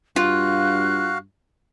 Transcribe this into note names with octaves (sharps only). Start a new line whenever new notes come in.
G2 F4 F#4 F5 F#6